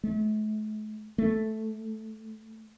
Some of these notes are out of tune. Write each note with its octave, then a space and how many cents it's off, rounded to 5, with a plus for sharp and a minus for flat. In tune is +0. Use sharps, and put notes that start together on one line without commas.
A3 -45
A3 -5